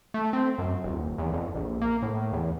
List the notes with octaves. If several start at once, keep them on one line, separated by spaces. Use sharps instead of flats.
A3
C4
F#2
D#1
E2
F2
A#1
A#3
A2
E2